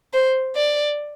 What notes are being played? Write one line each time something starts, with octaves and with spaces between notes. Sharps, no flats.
C5
D5